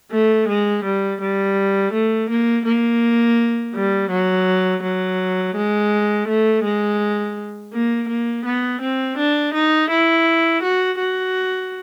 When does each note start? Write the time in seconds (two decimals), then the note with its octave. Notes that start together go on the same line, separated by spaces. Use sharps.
0.12 A3
0.48 G#3
0.85 G3
1.21 G3
1.93 A3
2.30 A#3
2.66 A#3
3.75 G3
4.10 F#3
4.83 F#3
5.56 G#3
6.28 A3
6.64 G#3
7.73 A#3
8.09 A#3
8.45 B3
8.81 C4
9.18 D4
9.54 D#4
9.90 E4
10.63 F#4
10.99 F#4